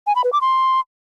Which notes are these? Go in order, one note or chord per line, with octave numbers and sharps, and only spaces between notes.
G#5
B5
B4
D6
C6